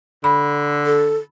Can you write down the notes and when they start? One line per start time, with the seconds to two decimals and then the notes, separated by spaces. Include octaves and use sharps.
0.24 D3 B5
0.86 A4